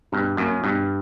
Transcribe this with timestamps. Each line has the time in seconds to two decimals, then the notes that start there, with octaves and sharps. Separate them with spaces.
0.12 G2 B2
0.37 F#2 A#3 C#4
0.64 G2 B2